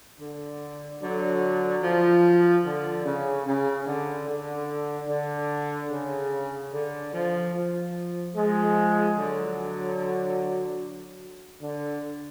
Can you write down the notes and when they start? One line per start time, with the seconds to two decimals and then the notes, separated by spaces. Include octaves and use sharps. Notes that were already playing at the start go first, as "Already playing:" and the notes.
0.19 D3
1.01 D3 F#3
1.82 F3
2.65 D3
3.05 C#3
3.46 C#3
3.87 D3
4.28 D3
5.08 D3
5.90 C#3
6.72 D3
7.13 F3
7.53 F3
8.35 F3 G#3
9.16 D3 F#3
11.62 D3